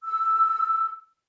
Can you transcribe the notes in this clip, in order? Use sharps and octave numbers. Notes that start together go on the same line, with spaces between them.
E6